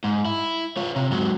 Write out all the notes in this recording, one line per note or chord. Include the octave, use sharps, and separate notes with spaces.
G#2
E4
F4 C#5
C3
G#2 F#3